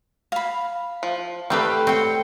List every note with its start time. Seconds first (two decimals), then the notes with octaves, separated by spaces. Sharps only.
0.32 F5 B5
1.03 F3
1.50 G3 A3 C4 G4 B4
1.87 C4 C#5 G5